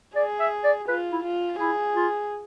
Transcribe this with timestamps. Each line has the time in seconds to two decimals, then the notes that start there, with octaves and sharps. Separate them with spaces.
0.16 G#4 D5
0.40 E5
0.64 D5
0.88 F4 B4
1.12 E4
1.23 F4
1.60 E4 G#4
1.96 F4